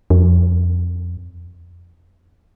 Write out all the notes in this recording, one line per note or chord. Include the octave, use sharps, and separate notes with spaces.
F2